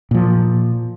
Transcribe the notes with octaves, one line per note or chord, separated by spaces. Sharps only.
A#2 F3